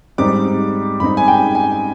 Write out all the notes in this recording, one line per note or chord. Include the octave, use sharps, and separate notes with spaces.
G#2 G3 C4 D#4 D6
G#2 G3 C4 D#4 B5
G#5
G5
G#5